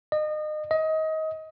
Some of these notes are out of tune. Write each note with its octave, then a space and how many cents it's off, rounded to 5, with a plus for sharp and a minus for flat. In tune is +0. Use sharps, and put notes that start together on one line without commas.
D#5 -30
D#5 +25